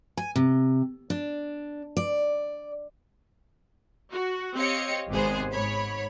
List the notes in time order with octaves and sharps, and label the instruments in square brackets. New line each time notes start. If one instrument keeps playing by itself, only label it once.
[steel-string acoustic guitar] G#5
C3
D4
D5
[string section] F#4
C4 G4 C#5 D#5 F5 C#7
G#1 C3 G#3 B3 G#4 C5
G#2 C#5 B5